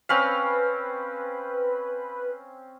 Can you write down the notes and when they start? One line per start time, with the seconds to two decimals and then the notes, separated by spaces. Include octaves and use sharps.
0.09 C4 C#4 B4 F5